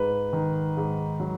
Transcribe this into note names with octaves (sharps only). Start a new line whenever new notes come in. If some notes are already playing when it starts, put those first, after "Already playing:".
Already playing: G#2 B4
D#3
G#2
F#3